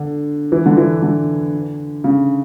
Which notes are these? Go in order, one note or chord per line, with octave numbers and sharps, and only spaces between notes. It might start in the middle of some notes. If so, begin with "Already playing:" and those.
Already playing: D3
E3
D3
E3
D3
C#3